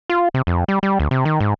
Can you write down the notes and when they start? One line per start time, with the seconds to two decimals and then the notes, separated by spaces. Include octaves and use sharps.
0.10 F4
0.34 C3
0.47 F2
0.68 G3
0.83 G3
1.00 D2
1.11 C3
1.25 D#3
1.40 G#2